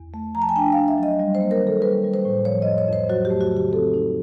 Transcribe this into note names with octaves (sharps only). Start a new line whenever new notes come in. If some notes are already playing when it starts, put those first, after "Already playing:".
Already playing: E2
A3
F3 A#5
A5
G#5
D4 G5
D4 F5
E5
F#3 D#5
G3
C5
A#3
A#4
D#3
A4
G3 B4
G3
C5
A2
F3 C#5
F2 D#5
C#5
F2 C5
F#3 F#4
G4
A3
F#4
C#3
G4
C4 A4
D#4